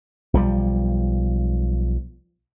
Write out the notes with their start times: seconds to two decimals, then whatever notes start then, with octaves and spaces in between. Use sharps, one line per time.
0.34 B1 F3 G3